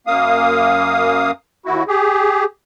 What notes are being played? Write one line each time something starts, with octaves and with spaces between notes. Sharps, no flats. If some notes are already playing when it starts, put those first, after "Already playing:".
F#2 A#3 F5 D#6
D#2 E4 F#4
G4 G#4